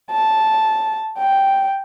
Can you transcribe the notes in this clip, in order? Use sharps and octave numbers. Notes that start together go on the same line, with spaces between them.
A5
G5